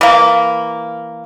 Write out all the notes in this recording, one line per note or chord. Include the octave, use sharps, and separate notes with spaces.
E3 A#3